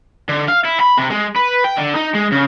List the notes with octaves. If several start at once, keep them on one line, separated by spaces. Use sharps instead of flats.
D3
F5
E4
B5
C3
G#3
B4
G5
D3
D#4
G#3
C#3